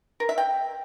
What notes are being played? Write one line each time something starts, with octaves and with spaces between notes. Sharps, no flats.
A#4
E5
G5